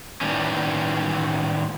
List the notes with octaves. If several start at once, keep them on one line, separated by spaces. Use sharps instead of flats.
A2 D#3 E3 G3 C#4